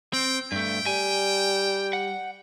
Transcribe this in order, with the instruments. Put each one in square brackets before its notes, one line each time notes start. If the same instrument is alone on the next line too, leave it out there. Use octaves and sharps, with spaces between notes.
[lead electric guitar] C4 [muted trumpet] G5
[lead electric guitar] G2 A3 [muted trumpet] G5
[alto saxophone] G3 [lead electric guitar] G#5
[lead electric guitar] F#5